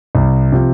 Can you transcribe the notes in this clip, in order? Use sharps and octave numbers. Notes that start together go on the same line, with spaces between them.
C2
C3 F3